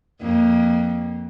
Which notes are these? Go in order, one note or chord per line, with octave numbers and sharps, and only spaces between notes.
F2 A#3